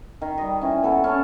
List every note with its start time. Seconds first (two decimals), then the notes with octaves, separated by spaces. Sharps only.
0.22 D#3
0.38 G3 D#5
0.61 E3 C#4
0.83 A#3 B3 A4 B4
1.04 C#4 C#5 A5